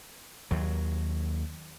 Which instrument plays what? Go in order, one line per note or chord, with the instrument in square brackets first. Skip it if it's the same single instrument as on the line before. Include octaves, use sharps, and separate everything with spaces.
[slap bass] D#2 F#3